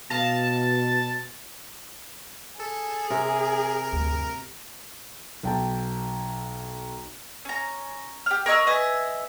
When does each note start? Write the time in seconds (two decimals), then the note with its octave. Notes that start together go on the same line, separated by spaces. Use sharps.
0.10 B2 D#5 F5 A5
2.60 G#4 A4
3.10 C3 A#4
3.92 D2 G2
5.43 B1 G5 A5
7.45 C#4 A#5
8.26 G4 F6
8.46 A#4 C#5 D#5 E6
8.67 B4 D#5 E5 G#5